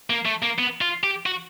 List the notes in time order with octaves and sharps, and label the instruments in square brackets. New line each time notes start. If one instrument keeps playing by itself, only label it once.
[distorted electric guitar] A#3
A3
A#3
B3
F4
G4
F#4